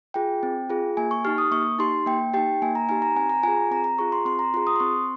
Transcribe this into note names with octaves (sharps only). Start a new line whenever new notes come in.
F4 G#4 G5
C4
F4 G#4
A#3 G#5
C#6
D#4 G4 F6
D#6
A#3 C#6
D#4 G4 C6
A#3 G5
D#4 G4 G5
A#3 G#5
A#5
D#4 G4 G#5
A#5
C4 G#5
A#5
F4 G#4 G#5
C4 A#5
A#5
F4 G#4 C#6
C6
C4 C6
A#5
F4 G#4 C6
D#6
C6
C4 C#6